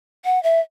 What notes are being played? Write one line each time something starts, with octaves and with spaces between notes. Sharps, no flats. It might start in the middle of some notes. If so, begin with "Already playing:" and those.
F#5
E5